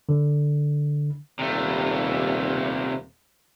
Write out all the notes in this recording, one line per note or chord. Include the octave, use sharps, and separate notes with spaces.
D3
D#1 C3 A3